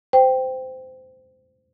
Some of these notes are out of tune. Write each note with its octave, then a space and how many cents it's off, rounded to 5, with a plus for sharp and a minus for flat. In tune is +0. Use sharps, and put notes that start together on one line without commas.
C5 -20 G5 +0